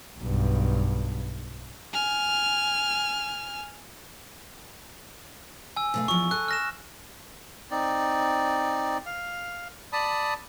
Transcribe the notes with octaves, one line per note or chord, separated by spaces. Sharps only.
B1 G2
G#5 F6
G#5 E6
B2 A3 F5
E2 F3 C#6
A4 D#5 F#6
F6 A#6 E7
C4 D#4 D5
F5
D5 A5 B5 D#6